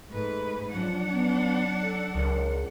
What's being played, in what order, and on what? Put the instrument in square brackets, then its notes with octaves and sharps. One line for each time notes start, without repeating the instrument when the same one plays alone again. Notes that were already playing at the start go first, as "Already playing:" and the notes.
[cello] G#2 B4 [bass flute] A3
[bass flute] F3 [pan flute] F#3 [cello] D4 F#5
[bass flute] B3
A4
[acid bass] C#2 [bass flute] A#4